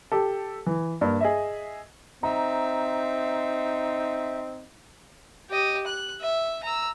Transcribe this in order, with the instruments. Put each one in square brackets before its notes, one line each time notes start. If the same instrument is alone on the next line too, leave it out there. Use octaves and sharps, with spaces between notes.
[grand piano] G4 A4
E3
G2 A#3
G#4 D#5 E5
[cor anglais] C4 [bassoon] D#4 [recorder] E5 [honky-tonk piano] A#5
[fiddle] G4 D#5
F#6
E5
A#5 E6